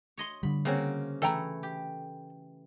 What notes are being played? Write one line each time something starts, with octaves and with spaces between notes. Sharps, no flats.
C#5 D#5 C6
D3 G3 B5
C#3 A#3 C4 C#4 F#4
E3 A3 E4 A4 G5 A#5
G4